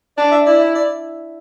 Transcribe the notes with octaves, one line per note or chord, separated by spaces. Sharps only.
D4 D5
E5
E4 D5
D5